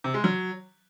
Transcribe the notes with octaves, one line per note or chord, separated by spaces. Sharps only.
C3
G#3
F#3